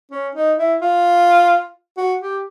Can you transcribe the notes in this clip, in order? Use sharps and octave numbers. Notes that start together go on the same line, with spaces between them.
C#4
D#4
E4
F4
F#4
G4